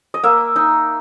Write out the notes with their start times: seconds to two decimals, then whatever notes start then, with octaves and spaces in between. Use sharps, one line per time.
0.14 D#5
0.23 A#3 E5
0.56 D#4